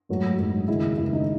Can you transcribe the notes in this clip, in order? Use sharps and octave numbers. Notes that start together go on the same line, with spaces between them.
G#2 F#3 A3
G#2 F#3 A3
D#2 C#3 G#3 E4
D#2 C#3 G#3 E4
D#4